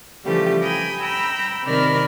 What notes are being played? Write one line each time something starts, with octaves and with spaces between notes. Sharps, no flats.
C#3 E3 F3 G3 A3 G4
G5 G#5 A#5 B5 D#6
G5 A#5 B5 E6
C3 D#3 A#4 D5 B5 F6